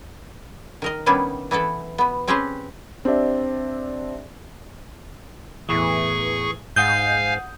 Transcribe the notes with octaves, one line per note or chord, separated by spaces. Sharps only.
D#3 A#4 D#5
D#3 G3 B3 C#4 D4 E4
E3 B3 E4 A4
B2 B3
C4 C#4 G4 G#4 B4 C5
C4 D4 G4 D5 E5
E2 A2 E3 G#4 C#6
G#2 F5 F#5 G#5 D#6 G6 G7